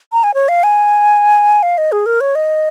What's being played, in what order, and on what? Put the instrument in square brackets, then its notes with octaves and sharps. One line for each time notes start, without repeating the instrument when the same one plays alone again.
[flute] A#5
G#5
C#5
F5
G#5
F5
D#5
G#4
A#4
C#5
D#5